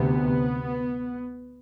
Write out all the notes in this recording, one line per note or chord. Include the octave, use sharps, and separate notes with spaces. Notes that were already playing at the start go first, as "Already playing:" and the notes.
Already playing: D2 C3 B3